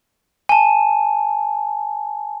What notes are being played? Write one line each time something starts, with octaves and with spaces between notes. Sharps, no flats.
G#5 A5